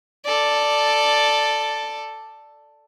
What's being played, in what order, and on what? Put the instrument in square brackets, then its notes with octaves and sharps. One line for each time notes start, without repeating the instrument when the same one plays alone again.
[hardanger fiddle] A4 D5